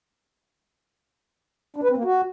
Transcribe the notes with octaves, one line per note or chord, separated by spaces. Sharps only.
D4
B4
C4
A#3
F#4